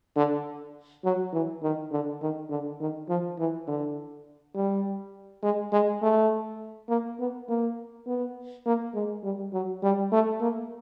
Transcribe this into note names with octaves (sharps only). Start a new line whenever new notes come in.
D3
F#3
E3
D#3
D3
D#3
D3
D#3
F3
E3
D3
G3
G#3
G#3
A3
A#3
B3
A#3
B3
A#3
G#3
G3
F#3
G3
A3
A#3